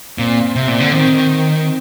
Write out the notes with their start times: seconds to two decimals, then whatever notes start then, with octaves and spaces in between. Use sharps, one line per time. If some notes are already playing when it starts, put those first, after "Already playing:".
0.19 A#2 C4
0.56 C3
0.68 A#2
0.80 D3
0.93 D#3 C4